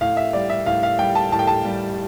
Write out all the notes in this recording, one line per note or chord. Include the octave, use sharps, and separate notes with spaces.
A2 F5
E5
G3 D5
E5
A2 F5
F5
G3 G5
A5
A2 A5
G5
A5
G3